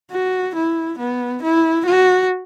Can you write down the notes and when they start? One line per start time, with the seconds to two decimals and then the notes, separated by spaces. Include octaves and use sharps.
0.11 F#4
0.55 E4
0.99 B3
1.43 E4
1.86 F#4